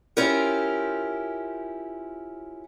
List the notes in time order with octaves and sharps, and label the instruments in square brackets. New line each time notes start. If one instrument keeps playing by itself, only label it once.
[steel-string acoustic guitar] C#4 E4 F4 G4 A#4 C5